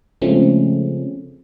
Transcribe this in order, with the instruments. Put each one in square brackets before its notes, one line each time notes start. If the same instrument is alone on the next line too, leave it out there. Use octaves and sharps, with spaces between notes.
[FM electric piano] C#3 F3 G#3 A3 C4 C#4